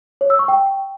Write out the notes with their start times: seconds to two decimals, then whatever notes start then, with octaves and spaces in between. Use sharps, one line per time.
0.21 C#5
0.30 E6
0.39 C#6
0.48 G5